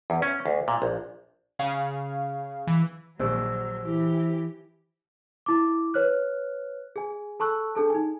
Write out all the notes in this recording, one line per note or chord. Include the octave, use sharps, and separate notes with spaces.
E2
C#4
D2
A#2
A#1
C#3 G#4 F5
E3
A#1 D#2 F#3 C5 E6
E3 E4 G4
E4 D6
B4 C#5 F6 F#6
G#4 G#5
A4 A5 B5 C#6 E6 F#6
D4 G#4 A4 A5
D#4 G#5